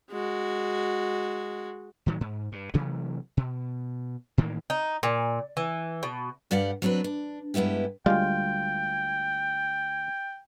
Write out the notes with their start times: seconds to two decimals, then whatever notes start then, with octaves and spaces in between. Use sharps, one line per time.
0.11 G#3 F#4
2.06 A2 D#3 F#3
2.21 G#2
2.52 G2
2.74 C3 E3 F#3 A3
3.37 B2
4.38 A2 D#3 E3 A#3
4.70 D#4
5.03 A#2
5.57 E3
6.03 B2
6.51 G2 G4 D5 F5 F#5
6.82 F#3 C4 D4 E4 B4
7.04 D4
7.54 G2 G#3 B3 E4 G4
8.06 D2 G3 G#3 F4 G5